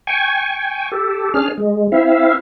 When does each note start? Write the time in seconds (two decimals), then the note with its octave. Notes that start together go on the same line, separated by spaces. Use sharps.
0.07 G5 G#5 C#6
0.92 G4 A4
1.34 C#4 D4 G#4 F6
1.58 G#3
1.92 C4 E4 E5 F5